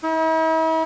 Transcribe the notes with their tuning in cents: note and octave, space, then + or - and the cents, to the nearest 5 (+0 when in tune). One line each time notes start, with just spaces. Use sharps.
E4 -45